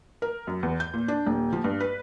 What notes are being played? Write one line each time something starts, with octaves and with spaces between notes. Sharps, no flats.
A#4
F#2
E2
G6
A#2
D4
D#1
F3
G2
B4